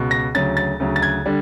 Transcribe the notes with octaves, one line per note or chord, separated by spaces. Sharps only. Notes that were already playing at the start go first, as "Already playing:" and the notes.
Already playing: C#2 B2
A#6
D2 C#3 F#3 A6
A6
D2 C#3 F#3
A6
G#6
D3 G3